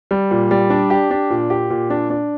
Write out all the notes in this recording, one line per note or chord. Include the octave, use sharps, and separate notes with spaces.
G3
A#2
G3
D4
G4
D4
A#2
G4
A#2
D4
D4